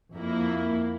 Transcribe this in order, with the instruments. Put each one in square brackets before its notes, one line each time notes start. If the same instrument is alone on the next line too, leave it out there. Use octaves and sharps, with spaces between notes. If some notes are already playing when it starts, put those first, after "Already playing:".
[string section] F2 A#3 E4